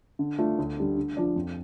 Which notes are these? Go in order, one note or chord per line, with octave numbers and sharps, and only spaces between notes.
D3
A3 D4 F4
D2
D3 G3 D4
D3
F3 D4 F4 D5
F2